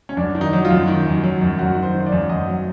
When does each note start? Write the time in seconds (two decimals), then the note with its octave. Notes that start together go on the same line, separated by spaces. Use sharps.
0.09 C#4
0.17 F#2 D4
0.35 D#3
0.41 D#4
0.53 F#3
0.65 F4
0.70 F#2
0.88 D#3
1.06 F#2
1.24 F#3
1.42 F#2
1.58 F#2 F#4
1.77 D#3
1.83 C5
1.94 D#3
2.06 D5
2.12 F#2
2.29 F#2 D#5
2.48 F#3